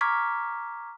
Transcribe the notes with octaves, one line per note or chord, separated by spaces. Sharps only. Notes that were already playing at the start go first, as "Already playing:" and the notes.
A#5 C#6 D6 F6 G#6 B6